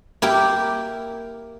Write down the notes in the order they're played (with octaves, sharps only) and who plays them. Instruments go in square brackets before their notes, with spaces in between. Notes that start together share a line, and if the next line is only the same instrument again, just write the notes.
[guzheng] A#3 E4 G4